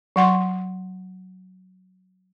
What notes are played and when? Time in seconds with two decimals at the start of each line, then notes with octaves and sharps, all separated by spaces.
0.16 F#3 F#5 C6 C#6